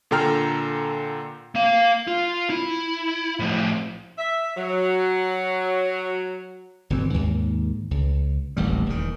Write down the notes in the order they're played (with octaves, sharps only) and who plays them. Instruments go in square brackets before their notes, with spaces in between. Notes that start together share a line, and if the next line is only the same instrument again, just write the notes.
[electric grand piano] A#2 D3 A4 G5 A#5 F6
[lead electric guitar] A#3 F5
F4
E4
A2 F3
[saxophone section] E5
F#3
[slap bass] G1 B2 E3 C4
D#2 G#2
C#2
D1 A1 D#2 G3
D#1 E2 D#3